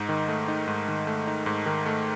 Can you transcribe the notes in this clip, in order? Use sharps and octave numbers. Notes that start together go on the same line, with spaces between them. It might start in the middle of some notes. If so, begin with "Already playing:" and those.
Already playing: G#2 D#4
D#3
A3
D#4
G#2
D#3
A3
D#4
G#2
D#3
A3